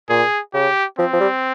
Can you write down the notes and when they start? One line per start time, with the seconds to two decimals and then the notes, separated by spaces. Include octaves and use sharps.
0.09 A#2 G#4
0.54 C#3 G4
0.99 F3 C4
1.13 F3
1.20 G3